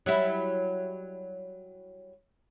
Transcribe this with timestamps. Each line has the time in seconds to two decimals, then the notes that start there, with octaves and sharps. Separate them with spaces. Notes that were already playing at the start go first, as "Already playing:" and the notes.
0.06 F#3 G3 E4